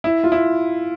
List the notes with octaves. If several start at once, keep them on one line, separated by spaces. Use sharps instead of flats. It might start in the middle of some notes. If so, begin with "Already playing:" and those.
E4
F4
E4